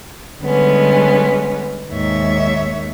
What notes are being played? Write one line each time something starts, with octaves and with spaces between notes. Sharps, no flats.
D3 G3 G#3 B3 C#4
D#2 G#2 C#5 E5